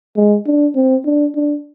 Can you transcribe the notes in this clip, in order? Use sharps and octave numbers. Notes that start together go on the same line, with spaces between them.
G#3
D4
C4
D4
D4